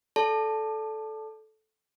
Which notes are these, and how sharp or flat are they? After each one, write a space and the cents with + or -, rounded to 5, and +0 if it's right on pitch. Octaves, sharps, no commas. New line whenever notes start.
A4 -10 D5 -20 A5 +0